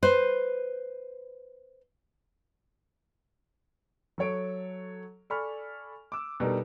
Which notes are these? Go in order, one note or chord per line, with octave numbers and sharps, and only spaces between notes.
B4 C5
F#3 A4 C#5 D7
A4 D5 G#5 B5 C#6 F6
D6 E6
B2 G3 D4 D#4 A4 A#4